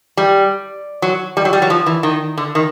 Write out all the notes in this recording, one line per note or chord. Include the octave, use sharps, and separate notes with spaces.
G3
F#3
G3
F#3
G3
F#3
F3
E3
D#3
D3
D#3